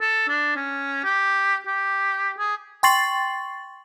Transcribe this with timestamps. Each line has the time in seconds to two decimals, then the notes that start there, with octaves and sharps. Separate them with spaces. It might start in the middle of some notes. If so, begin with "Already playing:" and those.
0.01 A4
0.28 D4
0.56 C#4
1.04 G4
1.67 G4
2.39 G#4
2.83 G5 C6 C#6 A6 C7 F#7